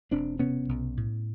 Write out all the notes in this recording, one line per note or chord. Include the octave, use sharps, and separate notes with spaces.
E1 C4 D4
C3 B3 C#4
B1
A2